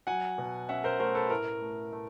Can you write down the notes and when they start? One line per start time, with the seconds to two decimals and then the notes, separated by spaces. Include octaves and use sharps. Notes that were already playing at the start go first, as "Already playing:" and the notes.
0.07 F#3 F#5 G#5
0.38 B2
0.69 C#4 E5 F#5
0.84 A#4 C5
1.00 A3 A#4 C5
1.15 A4 B4
1.30 A2 A#4
1.61 A3
1.92 A3